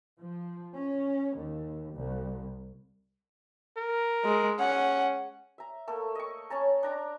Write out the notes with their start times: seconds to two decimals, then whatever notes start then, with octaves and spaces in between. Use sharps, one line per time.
0.20 F3
0.77 C#4
1.36 D#2
1.95 C2
3.77 A#4
4.25 G#3
4.59 C#4 F#5
5.58 E5 A#5
5.87 A3 A#3 A4
6.15 D#5 C#6
6.50 C#4 C#5 A5 A#5
6.83 D4 A#5 D6